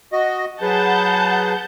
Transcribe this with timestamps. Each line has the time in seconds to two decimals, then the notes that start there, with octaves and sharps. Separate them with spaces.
0.13 F#4 D#5
0.62 F#3 G#4 B4 F#5 A5 G6